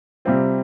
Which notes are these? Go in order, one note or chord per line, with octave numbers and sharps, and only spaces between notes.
C3 G3 C4 F4